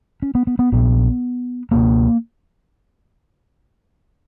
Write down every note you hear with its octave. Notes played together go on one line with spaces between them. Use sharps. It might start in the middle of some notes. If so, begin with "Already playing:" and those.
C#4
B3
B3
B3
A#1 A#2 B3
C#2 B2 A#3